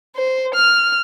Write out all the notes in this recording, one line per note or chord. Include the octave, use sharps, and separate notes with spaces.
C5
F6